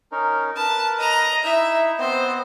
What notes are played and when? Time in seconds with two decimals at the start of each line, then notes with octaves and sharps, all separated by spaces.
0.12 C#4 D#4 A#4
0.57 A#4 B4 A5
0.99 D#5 A#5
1.43 D#4 E4 E5
1.99 B3 C4 C5 D#5